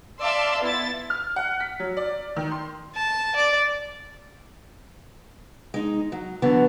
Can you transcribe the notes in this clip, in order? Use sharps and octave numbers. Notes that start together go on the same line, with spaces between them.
D5 E5 F5 A5 C6 E6
B3 E4 A6
F6
F#5
B6
F#3
D5
D#3
C6
A5
D5
G#3 D#4
F#3
D3 E3 F#3 B3